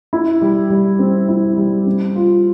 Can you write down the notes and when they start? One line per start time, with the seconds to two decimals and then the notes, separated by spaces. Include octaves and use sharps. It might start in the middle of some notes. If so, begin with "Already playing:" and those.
0.13 E4
0.42 G3
0.70 G3
0.99 C4
1.28 E4
1.57 G3
1.87 C4
2.15 F4